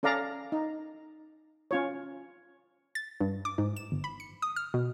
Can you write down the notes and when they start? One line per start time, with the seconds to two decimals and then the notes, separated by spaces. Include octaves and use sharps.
0.03 C#4 A4 D5 F5 A#5
0.52 D#4
1.71 C#4 F4 C#5
2.95 A6
3.21 G2
3.45 D6
3.58 G#2
3.76 E7
3.92 G1
4.04 B5
4.20 C#7
4.42 D#6
4.56 F6
4.74 B2